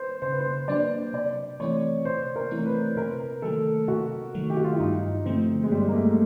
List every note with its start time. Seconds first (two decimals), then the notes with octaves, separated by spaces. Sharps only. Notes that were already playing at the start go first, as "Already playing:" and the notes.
Already playing: B4 C5
0.22 C#3 C5
0.32 B4
0.41 C5
0.68 F#3 A#3 D4 D5
1.13 C3 D5
1.60 E3 A3 C4 E4 C#5
2.05 C3 C5
2.36 A#4
2.51 E3 A3 C4 E4
2.66 B4
2.96 C3 A#4
3.42 D#3 F#3 A3 A4
3.88 C3 F#4
4.35 D#3 F#3 A3
4.50 G4
4.57 F#4
4.64 F4
4.72 E4
4.79 G2 D#4
5.25 D3 F3 A3 C4
5.63 G#3
5.71 G2 G3
5.88 A#3
5.94 A3